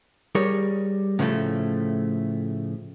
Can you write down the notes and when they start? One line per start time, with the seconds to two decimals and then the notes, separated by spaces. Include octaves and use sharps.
0.35 G3 G#4 A#4 C#5
1.19 A2 C#3 F3 G#3 A3